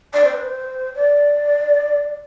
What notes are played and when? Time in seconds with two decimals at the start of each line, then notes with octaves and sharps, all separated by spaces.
0.13 D5
0.24 C5
0.34 B4
0.45 C5
0.96 D5